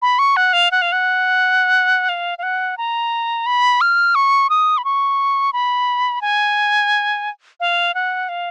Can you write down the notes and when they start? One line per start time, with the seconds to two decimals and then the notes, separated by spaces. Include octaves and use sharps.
0.02 B5
0.19 C#6
0.37 F#5
0.53 F5
0.71 F#5
0.82 F5
0.92 F#5
2.09 F5
2.38 F5
2.43 F#5
2.78 A#5
3.46 B5
3.81 F6
4.15 C#6
4.50 D#6
4.78 B5
4.85 C#6
5.53 B5
6.22 G#5
7.60 F5
7.94 F#5
8.29 F5